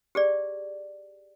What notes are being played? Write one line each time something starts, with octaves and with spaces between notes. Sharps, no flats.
G4 G#4 D5